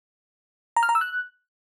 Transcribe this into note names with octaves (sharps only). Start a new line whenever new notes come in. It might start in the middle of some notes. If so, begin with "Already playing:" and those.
A#5
F6
A#5
E6
F#6